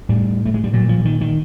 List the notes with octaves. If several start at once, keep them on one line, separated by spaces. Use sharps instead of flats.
A2 G3
A3
G#3
G3
A#2 F#3
F3
D#3
D#3